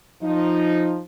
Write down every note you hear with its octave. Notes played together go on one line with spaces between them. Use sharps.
F3 D#4